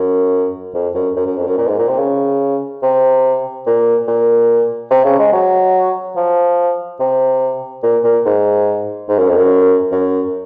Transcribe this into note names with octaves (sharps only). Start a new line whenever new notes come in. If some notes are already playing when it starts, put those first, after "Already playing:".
Already playing: F#2
F2
F#2
F#2
F#2
F2
F#2
A#2
G#2
A#2
C3
C#3
C3
A#2
A#2
C3
C#3
G#3
F#3
F3
C3
A#2
A#2
G#2
G#2
F#2
F2
F#2
F#2